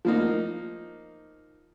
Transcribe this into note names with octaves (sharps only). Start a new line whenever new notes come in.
F3 A#3 D#4